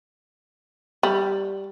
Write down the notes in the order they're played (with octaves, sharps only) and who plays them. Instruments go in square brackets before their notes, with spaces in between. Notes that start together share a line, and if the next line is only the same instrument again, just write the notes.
[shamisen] G3